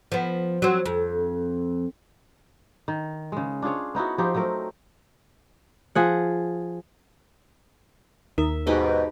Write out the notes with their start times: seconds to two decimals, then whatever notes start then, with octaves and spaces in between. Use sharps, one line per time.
0.12 F3 B3
0.62 F#3 C4
0.86 F2
2.88 D#3
3.32 C#3 G#3
3.62 D4 F4 G#4 C#5
3.95 B3 D#4 E4 F#4
4.18 F3 C4 D#4 G4
4.34 F#3 A3 C4 A#4
5.95 F3 G#4 F#5
8.38 D#2 E5
8.67 G#2 B2 D#4 G4 B4